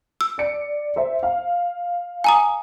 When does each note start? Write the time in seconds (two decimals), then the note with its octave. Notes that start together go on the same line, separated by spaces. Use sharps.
0.21 E6
0.38 D5 C#7 D7
0.96 C5 E5
1.23 F5
2.24 G#5 A#5 D#6